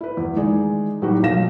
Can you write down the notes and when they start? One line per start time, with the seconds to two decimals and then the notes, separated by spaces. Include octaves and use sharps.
0.01 E4 B4
0.17 E2
0.36 D#3 E3 G#3 D#4 G#4 D5
1.02 A2 F#3 G3 D#4 F#4
1.23 B1 F3 F5 A#6 E7